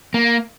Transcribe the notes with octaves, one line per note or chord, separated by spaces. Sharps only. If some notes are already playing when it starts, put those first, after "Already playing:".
A#3